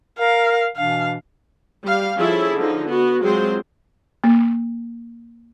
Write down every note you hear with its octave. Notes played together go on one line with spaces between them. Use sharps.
A#4 F5
B2 E3 D4 F5
G3 F5
F3 C#4 E4 G#4 A4 E5
D3 F3 D#4
B3 F#4
F#3 G#3 C4 F4 C5
A#3